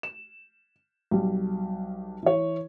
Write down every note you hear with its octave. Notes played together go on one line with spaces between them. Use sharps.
E7
B1 G3
E3 C#5